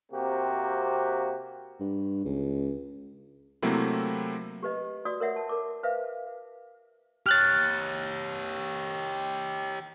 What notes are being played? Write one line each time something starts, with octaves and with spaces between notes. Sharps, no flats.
C3 A#3 C4 F#4 G4
G2
C#2
C3 F#3 A3 A#3 C4 E4
G4 B4 D#5
F#4 D5 D#6
A#4 C#5 E5 F#5
A5
A#4 D6
B4 C5 E5 F5
G4 C#5 F6 F#6 A6